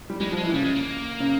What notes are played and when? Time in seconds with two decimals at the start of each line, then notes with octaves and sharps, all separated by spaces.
0.10 G3
0.20 G3 G#3
0.32 F3
0.37 G#3
0.43 E3
0.53 C#3 G3
0.65 G#3
0.75 A#3
1.20 C#3